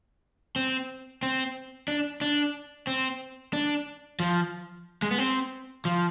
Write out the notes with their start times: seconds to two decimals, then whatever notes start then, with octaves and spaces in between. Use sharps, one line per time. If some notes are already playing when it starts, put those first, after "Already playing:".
0.56 C4
1.23 C4
1.88 D4
2.21 D4
2.87 C4
3.53 D4
4.20 F3
5.02 G#3
5.11 B3
5.18 C4
5.85 F3